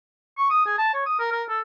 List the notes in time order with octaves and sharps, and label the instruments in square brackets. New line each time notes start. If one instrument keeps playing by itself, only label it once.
[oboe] C#6
D#6
G#4
A5
C#5
D#6
A#4
A#4
A4